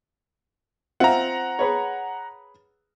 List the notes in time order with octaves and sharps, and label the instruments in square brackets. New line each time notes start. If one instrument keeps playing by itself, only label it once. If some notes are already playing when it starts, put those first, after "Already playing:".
[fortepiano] C4 F4 E5 [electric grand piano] F#5 A#5
[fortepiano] G#4 B4 C#5